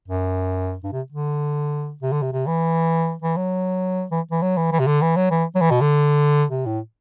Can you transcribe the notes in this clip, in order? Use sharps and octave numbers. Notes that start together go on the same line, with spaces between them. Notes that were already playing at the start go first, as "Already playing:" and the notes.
F#2
G2
C3
D3
C3
D3
C3
C3
E3
E3
F#3
E3
E3
F#3
E3
E3
C3
D3
E3
F#3
E3
F#3
E3
B2
D3
C3
A2